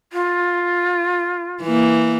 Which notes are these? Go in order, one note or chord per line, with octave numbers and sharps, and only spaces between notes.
F4
E3 A#3